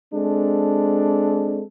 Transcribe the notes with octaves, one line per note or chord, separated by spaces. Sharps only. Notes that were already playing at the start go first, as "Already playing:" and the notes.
G#3 C4 D4 A4